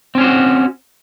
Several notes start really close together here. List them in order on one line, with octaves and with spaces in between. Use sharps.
C4 C#4 C5 F#4